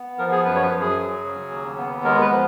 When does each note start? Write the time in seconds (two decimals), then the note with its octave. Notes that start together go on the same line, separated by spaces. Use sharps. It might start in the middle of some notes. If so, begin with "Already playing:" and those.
Already playing: B3
0.18 F3 A#4
0.32 G#4
0.45 F#2 B4
0.55 C#5
0.62 B4
0.72 F#2
0.81 G#4
0.99 F#3
1.24 C#3
1.51 D#2
1.77 B3
2.04 G#3 A#4
2.21 B4
2.30 F3